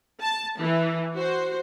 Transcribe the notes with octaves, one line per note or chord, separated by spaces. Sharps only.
A5
E3
F#4 C5